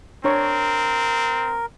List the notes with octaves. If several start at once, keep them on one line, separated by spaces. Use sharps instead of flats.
C4 D4 A#4 C#5 C#6